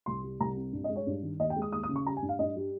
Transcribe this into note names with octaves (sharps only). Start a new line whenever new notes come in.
C2 C6
G3
C2 A#5
C3
G2
D#5
G#3
C#5
G2
D#3
D#2 D#5
G5
G#3
D#6
D#2 D#6
D#6
C#3
C#6
G3 A#5
G#5
G2
F5
G2 D#5
G3